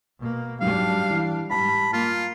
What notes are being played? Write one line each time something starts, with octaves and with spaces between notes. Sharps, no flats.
B2 A#3
G#2 F#3 G3 D4 F5
E3
G#2 G3 A5 B5
A#3 F4